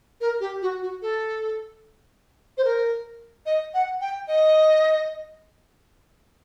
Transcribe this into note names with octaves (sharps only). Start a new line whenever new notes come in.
A#4
G4
F#4
F#4
A4
C5
A#4
D#5
F#5
G5
D#5